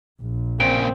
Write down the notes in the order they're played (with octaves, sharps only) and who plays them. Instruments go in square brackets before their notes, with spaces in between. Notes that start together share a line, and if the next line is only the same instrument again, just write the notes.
[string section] A#1
[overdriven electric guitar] A#2 C#3 [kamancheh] C4 [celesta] D7